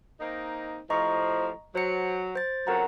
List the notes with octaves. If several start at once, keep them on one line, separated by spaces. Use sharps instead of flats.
A#3 C4 D#4
A2 C3 F3 D#5 A#5 C#6
F#3 C5 C#7
C5 A6
F2 C#3 F#3 A#4 F#5 A#5